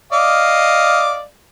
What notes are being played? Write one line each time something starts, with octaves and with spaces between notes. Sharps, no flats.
D5 D#5 F5